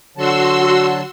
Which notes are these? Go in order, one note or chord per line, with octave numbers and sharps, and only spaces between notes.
D3 F#3 F#4 A5 C6 E6